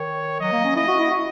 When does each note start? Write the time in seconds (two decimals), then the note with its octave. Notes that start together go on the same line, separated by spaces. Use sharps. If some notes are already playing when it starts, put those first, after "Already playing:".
Already playing: D#3 C#5
0.40 F#3 D#5
0.52 A#3
0.64 C#4
0.76 E4 D#5
0.88 F#4
1.00 E4
1.11 F#4